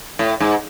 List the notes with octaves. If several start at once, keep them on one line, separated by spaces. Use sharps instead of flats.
A2
G#2